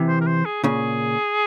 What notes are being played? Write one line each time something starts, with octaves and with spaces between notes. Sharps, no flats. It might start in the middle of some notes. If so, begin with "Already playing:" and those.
Already playing: C3 E3
C5
A#4
C5
G#4
A#2 C#3 G#4